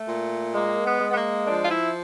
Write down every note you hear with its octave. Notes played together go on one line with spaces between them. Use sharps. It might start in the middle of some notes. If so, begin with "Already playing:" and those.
Already playing: A3
A#2
G#3 A#3
B3
G#3
B3
A#3
F3 D4
F4
E4